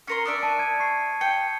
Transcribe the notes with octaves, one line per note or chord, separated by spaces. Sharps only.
C#4 A#4 C6 F6 C#7
D4 D5 E5 D#6 D7
A5 D#7
G#6 D#7
C#6 C7
G5 C#7